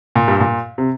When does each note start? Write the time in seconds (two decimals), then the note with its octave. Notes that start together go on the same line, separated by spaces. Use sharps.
0.16 A#2
0.28 G2
0.40 A#2
0.78 C3